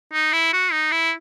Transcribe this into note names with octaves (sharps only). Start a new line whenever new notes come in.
D#4
E4
F#4
D#4
E4